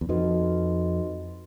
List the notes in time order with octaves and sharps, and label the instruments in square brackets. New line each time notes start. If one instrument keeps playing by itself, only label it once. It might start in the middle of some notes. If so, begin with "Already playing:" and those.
[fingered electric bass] E2
[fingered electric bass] F2 [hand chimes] D#4 F#4 B4 D#5